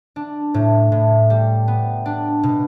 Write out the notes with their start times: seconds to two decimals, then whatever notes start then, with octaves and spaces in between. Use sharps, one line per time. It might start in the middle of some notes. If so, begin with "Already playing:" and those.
0.16 D4
0.54 A2
0.92 A2
1.30 G3
1.68 B3
2.06 D4
2.43 B2